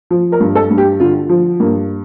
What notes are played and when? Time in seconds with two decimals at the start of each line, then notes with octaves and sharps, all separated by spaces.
0.11 F3
0.32 A#4
0.40 G2
0.55 A4
0.71 G2
0.78 G4
1.00 D3 F4
1.29 F3
1.60 G2 A#3